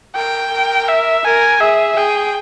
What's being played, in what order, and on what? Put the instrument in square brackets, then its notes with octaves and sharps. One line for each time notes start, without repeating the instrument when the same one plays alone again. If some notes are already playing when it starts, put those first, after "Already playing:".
[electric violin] A#4 [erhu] G5
[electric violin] A#4
[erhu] E5
[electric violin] A#4 [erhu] G#5
[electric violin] G#4 [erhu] E5
[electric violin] G#4 [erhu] G5